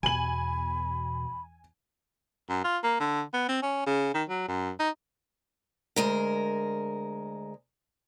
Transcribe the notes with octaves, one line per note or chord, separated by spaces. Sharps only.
E2 B2 G#5 B5 F#7
F#2
F4
A#3
D3
B3
C4
C#4
C#3
D#3
F#3
F#2
D#4
D2 G#3 A#4